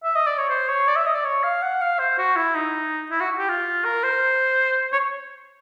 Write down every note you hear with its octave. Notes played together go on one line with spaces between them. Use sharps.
E5
D#5
D5
C#5
C5
C#5
D5
E5
D#5
D5
C#5
F5
F#5
F5
C5
F#4
E4
D#4
E4
F#4
G4
F4
A#4
C5
C#5